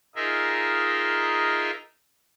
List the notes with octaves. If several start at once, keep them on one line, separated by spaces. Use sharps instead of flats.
D#4 F4 G#4 A#4 D#5 E5